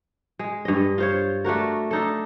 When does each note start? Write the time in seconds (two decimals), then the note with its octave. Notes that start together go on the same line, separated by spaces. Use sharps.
0.39 G#3
0.65 G2 D#5
0.98 F4 C5 C#5
1.44 A3 D4 F#4 A#4
1.91 D4 D#4 A4